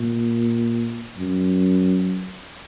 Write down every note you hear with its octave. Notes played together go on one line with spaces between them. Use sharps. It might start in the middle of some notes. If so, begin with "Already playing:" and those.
Already playing: A#2
F#2